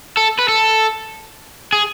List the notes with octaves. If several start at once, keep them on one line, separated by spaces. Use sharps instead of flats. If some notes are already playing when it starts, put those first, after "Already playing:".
A4
B4
A4
G#4